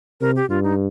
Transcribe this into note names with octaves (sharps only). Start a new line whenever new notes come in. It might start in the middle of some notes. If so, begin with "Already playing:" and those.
C3 A#4
G4
G2 F4
D#4